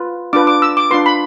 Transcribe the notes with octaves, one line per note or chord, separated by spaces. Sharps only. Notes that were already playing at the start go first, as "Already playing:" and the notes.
Already playing: F4 B4
D4 F4 B4 D6
D6
E6
D6
D4 F4 B4 C6
B5